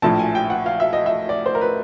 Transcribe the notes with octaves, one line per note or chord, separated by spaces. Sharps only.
A#1 A2 F3 A5
G#5
G5
F#5
F5
E5
D#5
E5
D5
C5
A#4
B4